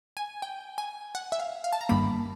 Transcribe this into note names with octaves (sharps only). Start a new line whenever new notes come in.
G#5
G5
G#5
F#5
E5
F5
F5
A5
A#5
G1 G2 D#3 G3 A#3 B5